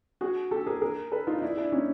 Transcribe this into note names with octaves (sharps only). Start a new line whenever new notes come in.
F#4 G#4
G4 A4
G#4 A#4
G#4 A#4
A4 B4
D#4 F4
D#4
D4 E4
D4 E4
C#4 D#4